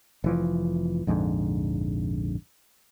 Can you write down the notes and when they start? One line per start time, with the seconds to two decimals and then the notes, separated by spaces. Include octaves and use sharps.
0.24 F1 E3 F3
1.07 A#1 F2 G#2 D3